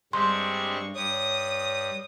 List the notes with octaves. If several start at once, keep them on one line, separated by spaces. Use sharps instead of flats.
G2 G3 G#3 C4 D4 C6 C#6
G2 C#5 D#6